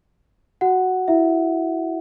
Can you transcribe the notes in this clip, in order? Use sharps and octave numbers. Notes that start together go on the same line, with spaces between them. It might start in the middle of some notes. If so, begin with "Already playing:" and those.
F#4 F#5
E4 E5